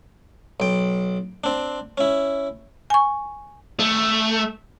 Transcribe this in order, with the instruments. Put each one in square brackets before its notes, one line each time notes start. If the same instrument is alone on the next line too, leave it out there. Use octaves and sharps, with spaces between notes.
[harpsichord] B1 G5
C4 D4
C#4 E4
[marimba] G#5 C#6
[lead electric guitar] A3